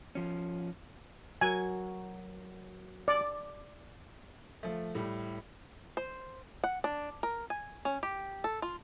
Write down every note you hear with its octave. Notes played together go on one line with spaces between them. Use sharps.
F3 C#4
F#3 F#4 A#4 G#5
D5
F3 A3
A2 G3
C5
F#5
D4
A#4
G#5
C#4
G4
A4
F4